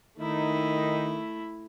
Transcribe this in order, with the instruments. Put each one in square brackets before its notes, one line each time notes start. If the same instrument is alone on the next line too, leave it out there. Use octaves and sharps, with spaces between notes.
[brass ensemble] D#3 D#4 [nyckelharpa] A3 E4